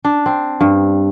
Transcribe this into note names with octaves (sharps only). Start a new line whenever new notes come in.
D4
C4
G2